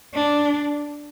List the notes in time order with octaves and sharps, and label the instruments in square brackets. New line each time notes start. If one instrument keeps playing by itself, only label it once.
[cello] D4